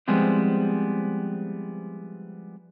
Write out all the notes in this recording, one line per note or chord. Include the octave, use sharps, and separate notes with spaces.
F3 G3 G#3 B3 C4 E4